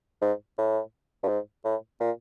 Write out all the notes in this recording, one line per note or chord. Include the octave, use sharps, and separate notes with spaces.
G#2
A2
G2
G#2
A2
A#2